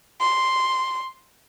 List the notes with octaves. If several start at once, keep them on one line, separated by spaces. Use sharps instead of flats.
C6